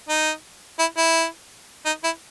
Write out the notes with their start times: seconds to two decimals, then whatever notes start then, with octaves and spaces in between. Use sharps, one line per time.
0.09 D#4
0.79 E4
0.98 E4
1.86 D#4
2.04 E4